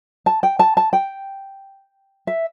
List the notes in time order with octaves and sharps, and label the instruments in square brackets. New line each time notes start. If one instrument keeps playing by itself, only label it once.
[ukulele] A5
G5
A5
A5
G5
E5